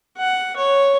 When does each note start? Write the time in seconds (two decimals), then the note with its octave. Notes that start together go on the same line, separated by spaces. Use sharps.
0.18 F#5
0.57 C#5